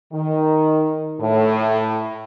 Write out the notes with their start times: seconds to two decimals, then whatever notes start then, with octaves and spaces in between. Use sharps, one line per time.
0.13 D#3
1.20 A2